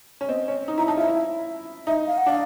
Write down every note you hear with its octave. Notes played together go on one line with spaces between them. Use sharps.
C#4
C4 D#5
C#4
D#4
E4 A#5
D#4 A5
F4 E5
E4
D#4 E5
F5
F#5
D4 F5